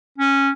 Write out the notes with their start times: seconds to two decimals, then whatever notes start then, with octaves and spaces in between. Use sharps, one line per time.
0.18 C#4